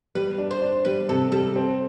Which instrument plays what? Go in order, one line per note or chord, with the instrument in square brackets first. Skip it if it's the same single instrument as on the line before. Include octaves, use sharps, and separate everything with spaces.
[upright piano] G3 [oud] B4
[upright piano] D4
[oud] C5
[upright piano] D4
[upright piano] G3 [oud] B4
[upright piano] C3 [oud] A4
[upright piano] G3 [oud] A4
[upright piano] C4